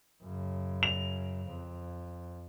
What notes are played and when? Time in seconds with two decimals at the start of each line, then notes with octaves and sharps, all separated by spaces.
0.23 F#2 C#3
0.83 F7
1.48 F2